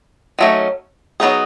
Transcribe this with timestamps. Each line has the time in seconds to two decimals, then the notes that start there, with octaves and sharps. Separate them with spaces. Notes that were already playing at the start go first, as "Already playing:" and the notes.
0.39 D#3 F#3 A3 C#4
1.20 F#3 B3 D#4 G#4